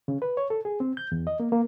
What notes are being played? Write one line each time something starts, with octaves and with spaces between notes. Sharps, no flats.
C#3
B4
C#5
A4
G#4
C4
G6
E2
D#5
A#3
A#3